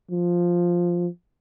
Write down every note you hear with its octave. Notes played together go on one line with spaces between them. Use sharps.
F3